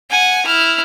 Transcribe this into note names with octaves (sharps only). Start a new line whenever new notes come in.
F#5 G#5
E4 F6